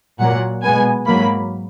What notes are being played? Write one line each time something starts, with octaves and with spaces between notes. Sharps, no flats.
A#2 F#3 A#3 F#5
B2 G#3 B3 G#5
G#2 F#3 A#3 B5